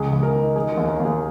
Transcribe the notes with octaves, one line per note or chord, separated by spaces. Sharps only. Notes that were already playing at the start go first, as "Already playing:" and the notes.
Already playing: C#2 G#4
C#2
A#4
D#3
D#3 G#4
D#2 A#4
A#4
D#2
G#4